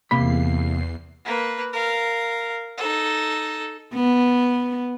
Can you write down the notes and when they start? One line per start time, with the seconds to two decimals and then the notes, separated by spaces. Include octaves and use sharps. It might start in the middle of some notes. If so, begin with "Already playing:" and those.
0.11 E2 C3 A#3 B5 C7
1.25 A#3 B4
1.73 A#4 F5
2.78 D#4 A4
3.94 B3